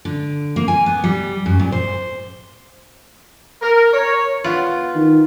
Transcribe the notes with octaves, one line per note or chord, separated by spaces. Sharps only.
D3
A#3
G#5
B3
G3
F#2
A#2
C5
A#4
C#5
B3 F4
D#3